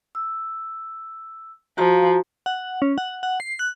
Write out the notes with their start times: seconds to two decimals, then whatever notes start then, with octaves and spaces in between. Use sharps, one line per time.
0.15 E6
1.78 F3 F#4 F5 A#5
2.46 F#5
2.82 C#4
2.98 F#5
3.23 F#5
3.40 C7
3.59 F#6